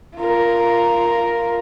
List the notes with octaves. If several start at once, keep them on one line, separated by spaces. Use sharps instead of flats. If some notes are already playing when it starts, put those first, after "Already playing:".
F4 A#4